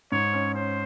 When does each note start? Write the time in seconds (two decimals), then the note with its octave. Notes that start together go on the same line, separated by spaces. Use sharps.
0.12 G#2 C#5
0.34 C#4
0.54 C#4 C5